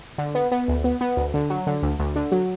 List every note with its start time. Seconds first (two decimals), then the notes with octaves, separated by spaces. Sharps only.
0.18 D3
0.35 B3
0.52 B3
0.68 D2
0.84 B3
1.01 B3
1.17 D2
1.34 D3
1.50 F#3
1.67 D3
1.83 D2
1.99 D2
2.16 D3
2.32 F#3